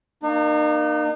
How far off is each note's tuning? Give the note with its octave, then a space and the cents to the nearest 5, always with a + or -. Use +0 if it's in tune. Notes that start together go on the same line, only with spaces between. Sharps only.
A#3 +0 D#4 -40